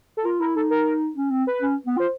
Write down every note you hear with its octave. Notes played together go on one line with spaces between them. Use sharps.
A4
F4 A#4
E4 A#4
D#4 A4
A#4
C#4
C4
B4
C#4
B3
F4 C5